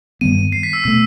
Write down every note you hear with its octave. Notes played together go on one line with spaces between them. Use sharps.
G2 D#3 G3 B3 D#7
C7
B6
E6
B2 A3 E6